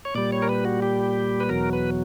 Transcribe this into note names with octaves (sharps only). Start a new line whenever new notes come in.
C#5
A#2 G3 D5
C#5
A#4
B4
F#4
G4
B4
E2 B2 F#3 A#4
B4